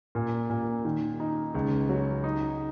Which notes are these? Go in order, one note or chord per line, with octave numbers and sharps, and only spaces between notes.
A#2
A#2
D#3
D#4
C#2
F#3
D#4